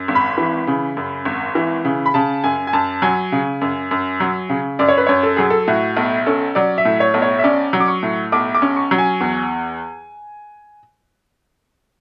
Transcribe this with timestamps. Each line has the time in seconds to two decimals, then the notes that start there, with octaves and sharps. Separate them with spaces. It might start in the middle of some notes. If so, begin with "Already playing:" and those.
Already playing: F#2
0.08 G#1
0.15 B5
0.38 E3
0.67 C#3
0.97 F#2
1.25 G#1
1.55 E3
1.85 C#3
2.06 B5
2.14 C#3 A5
2.44 F#2 G#5
2.67 G#5
2.73 F#2 A5
3.02 F#3 G#5
3.32 C#3
3.61 F#2
3.91 F#2
4.20 F#3
4.49 C#3
4.79 F#2 D5
4.88 C#5
4.98 B4
5.07 F#2 C#5
5.23 A4
5.37 F#3 G#4
5.50 A4
5.68 A2 F#4
5.97 B1
6.27 C#4 A4
6.55 F#3 D5
6.78 E5
6.85 A2
7.00 C#5
7.14 B1
7.22 C#5
7.39 E5
7.44 C#4 D5
7.73 F#3
7.80 D6
7.88 C#6
8.03 A2
8.32 B1 D6
8.55 D6
8.62 C#4
8.77 C#6
8.91 F#3
8.98 G#5
9.20 E2